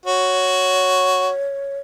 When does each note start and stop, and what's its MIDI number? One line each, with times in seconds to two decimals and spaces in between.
0.06 1.31 66
0.06 1.79 73